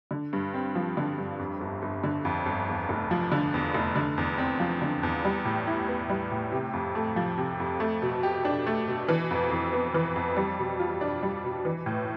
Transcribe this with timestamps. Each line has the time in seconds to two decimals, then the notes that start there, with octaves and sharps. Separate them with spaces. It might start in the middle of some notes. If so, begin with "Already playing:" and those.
0.11 D3
0.33 G2
0.54 C4
0.75 F3
0.97 D3
1.18 G2
1.39 F2
1.61 G1
1.82 G1
2.04 D3
2.25 F2
2.46 G1
2.68 E2
2.89 F1
3.11 F3
3.32 D3
3.54 E2
3.74 F1
3.96 D3
4.18 E2
4.38 C4
4.60 F3
4.82 D3
5.03 E2
5.24 G3
5.45 A2
5.67 E4
5.88 B3
6.10 G3
6.31 A2
6.52 C3
6.73 F2
6.95 A3
7.16 F3
7.38 C3
7.60 F2
7.80 A3
8.02 B2
8.23 G4
8.45 D4
8.67 A3
8.88 B2
9.09 E3
9.31 F2
9.51 F2
9.73 B3
9.94 E3
10.16 F2
10.37 G3
10.59 B2
10.80 F4
11.01 D4
11.23 G3
11.44 B2
11.65 E3
11.86 A2